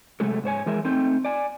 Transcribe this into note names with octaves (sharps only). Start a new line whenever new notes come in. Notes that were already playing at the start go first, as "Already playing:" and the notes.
C3 F#3 G#3 A3 F#4 A4
G#2 C5 C#5 G#5
E3 G#3 G#4 A#4 E5
A3 C4 D#4 G5
D5 G#5